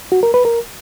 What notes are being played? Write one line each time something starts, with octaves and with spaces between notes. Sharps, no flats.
F#4
A#4
B4
A#4